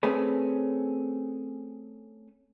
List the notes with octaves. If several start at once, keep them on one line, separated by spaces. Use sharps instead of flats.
A3 C4 C#4 G#4 B4